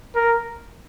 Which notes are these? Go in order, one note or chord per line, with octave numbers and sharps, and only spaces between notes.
A#4